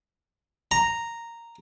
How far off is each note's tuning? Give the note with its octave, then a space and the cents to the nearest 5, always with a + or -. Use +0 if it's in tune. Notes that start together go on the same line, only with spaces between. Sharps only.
A#5 -5